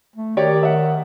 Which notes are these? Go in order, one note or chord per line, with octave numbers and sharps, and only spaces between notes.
A3
D#3 G4 C#5 D5
E5 F#5